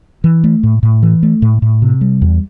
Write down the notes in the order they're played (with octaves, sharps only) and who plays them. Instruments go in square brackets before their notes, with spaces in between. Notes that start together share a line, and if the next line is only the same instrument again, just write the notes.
[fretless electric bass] E3
A3
A2
A2
E3
A3
A2
A2
C3
G3
E2